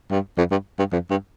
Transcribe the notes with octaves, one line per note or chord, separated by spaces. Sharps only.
G2
F2
G2
G2
F2
G2